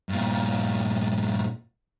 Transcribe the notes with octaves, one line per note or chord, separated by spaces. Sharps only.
G2 A#2